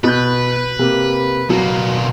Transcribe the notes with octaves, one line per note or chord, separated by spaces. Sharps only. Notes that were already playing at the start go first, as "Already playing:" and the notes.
B2 B4 G6
C3 A#3
B2 F#3 A#3